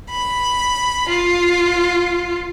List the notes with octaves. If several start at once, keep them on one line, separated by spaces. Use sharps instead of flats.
B5
F4